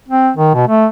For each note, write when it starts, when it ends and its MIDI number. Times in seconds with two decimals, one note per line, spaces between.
0.08 0.30 60
0.37 0.53 51
0.55 0.67 47
0.67 0.86 57